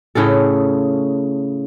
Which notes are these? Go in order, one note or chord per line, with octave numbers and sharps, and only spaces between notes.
A2 C#3 G#4 A4